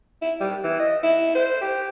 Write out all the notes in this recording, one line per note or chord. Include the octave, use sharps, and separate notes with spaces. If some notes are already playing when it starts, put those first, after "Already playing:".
E4
G3
E3
D#5
E4
C5
G4